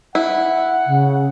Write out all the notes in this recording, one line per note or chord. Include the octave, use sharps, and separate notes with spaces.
E4 F#5
C#3